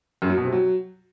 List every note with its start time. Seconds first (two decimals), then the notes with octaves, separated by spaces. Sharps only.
0.22 F#2
0.30 F#3
0.37 B2
0.45 C3
0.52 F#3